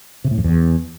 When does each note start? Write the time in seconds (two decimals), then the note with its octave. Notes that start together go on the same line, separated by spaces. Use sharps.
0.24 C3
0.31 A2
0.38 F2
0.44 E2